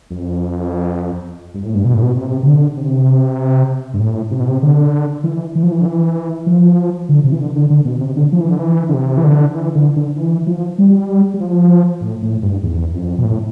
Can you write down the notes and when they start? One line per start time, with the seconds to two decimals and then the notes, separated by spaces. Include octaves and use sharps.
0.11 F2
1.54 G2
1.65 A2
1.75 G2
1.85 B2
1.94 A2
2.03 B2
2.16 C3
2.43 C3
2.46 D3
2.77 C3
3.94 G2
4.00 A2
4.31 C3
4.40 B2
4.48 C3
4.63 D3
5.24 E3
5.55 E3
5.63 F3
5.72 E3
5.81 D3
5.86 E3
6.46 F3
7.09 D3
7.24 C3
7.32 E3
7.40 D3
7.55 D3
7.70 D3
7.85 B2
8.00 C3
8.16 D3
8.32 F3
8.41 E3
8.50 D3
8.59 E3
8.89 D3
8.94 C3
9.17 E3
9.24 D3
9.55 E3
9.75 D3
9.96 D3
10.16 E3
10.47 F3
10.78 G3
11.34 G3
11.40 F3
12.01 A2
12.22 A2
12.43 G2
12.63 E2
12.94 F2
13.18 B2
13.24 A2